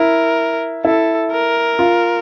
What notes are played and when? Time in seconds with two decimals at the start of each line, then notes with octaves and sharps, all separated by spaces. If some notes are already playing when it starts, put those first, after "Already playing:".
Already playing: E4 A#4
0.85 E4 A4
1.32 A#4
1.79 F4